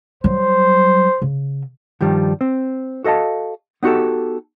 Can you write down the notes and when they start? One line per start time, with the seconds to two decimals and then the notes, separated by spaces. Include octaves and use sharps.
0.24 F#3 G3 C5
1.22 C#3
2.01 G2 D#3 F3 G3
2.41 C4
3.04 F#4 A4 D#5 F5 A5
3.83 B3 D#4 F#4 G4 A4